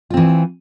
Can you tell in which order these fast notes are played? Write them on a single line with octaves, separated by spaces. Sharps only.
F4 C4 E3